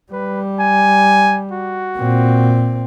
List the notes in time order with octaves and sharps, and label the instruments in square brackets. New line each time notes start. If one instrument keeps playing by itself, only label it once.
[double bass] G3 [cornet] B4
[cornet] G#5
F#4
[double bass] A#2 C4